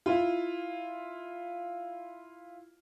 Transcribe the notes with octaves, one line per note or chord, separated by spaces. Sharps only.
E4 F4